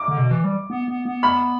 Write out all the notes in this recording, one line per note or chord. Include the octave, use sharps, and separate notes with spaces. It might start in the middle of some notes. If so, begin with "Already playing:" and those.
Already playing: D6
D3
B2
E3
G3
B3
B3
B3
B5